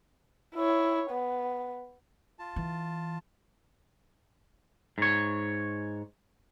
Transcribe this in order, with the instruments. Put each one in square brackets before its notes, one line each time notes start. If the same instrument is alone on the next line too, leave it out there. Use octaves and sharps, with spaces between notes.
[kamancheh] E4 C#5
B3
[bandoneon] F4 A5
[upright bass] E3
[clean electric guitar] G#2 C#5